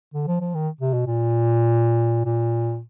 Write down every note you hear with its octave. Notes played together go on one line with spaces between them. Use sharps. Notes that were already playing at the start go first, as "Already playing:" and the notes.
D3
F3
F3
D#3
C3
B2
A#2
A#2